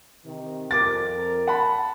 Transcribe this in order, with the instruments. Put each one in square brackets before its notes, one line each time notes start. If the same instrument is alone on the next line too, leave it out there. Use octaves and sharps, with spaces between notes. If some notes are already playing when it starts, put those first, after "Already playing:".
[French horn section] C3 D#3
[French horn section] F2 A#4 [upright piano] D6 A6
[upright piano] F#5 A5 B5